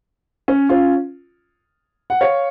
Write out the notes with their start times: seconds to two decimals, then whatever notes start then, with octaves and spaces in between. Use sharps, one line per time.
0.48 C#4
0.69 C#4 F4
2.10 F#5
2.21 C#5 F5